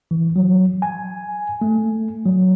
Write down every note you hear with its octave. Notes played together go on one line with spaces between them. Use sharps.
E3
F#3
G#5
A3
F#3